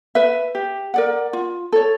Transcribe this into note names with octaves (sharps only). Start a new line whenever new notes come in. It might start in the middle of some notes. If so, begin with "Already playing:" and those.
B4 E5
G4
A#4 D5 F#5
F4
A4 C#5